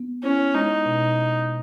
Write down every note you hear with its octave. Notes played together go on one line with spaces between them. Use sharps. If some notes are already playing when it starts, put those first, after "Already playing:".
Already playing: B3
C#4 E4
G#3 D#4
B2